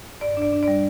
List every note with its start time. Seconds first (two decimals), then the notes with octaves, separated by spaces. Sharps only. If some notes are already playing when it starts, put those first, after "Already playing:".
0.21 G2 D5
0.37 D4 D5
0.52 D4
0.63 G3 D5